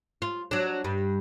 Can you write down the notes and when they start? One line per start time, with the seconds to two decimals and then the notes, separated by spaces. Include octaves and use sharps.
0.22 F4
0.51 F#3 D4
0.84 G2